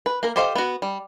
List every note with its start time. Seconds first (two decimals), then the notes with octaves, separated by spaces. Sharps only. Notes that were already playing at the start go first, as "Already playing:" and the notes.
0.06 B4
0.23 A#3 A#4
0.36 G4 A4 C5 D#5 F5
0.55 B3 F#4
0.82 G3